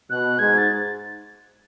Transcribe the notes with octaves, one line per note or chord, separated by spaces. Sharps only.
B2 F#6
G#2 G#6
A6